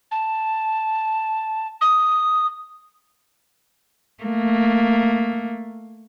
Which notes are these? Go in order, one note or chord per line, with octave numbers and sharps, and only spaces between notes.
A5
D#6
A3 A#3